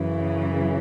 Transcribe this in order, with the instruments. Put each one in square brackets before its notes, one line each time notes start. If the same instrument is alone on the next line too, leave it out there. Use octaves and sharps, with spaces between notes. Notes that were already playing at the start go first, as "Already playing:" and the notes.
Already playing: [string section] F#2 C#3 E3